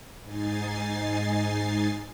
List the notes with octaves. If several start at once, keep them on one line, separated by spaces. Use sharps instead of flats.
G#2 D#4 G#5 A6 C7